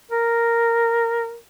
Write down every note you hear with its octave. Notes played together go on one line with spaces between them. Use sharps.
A#4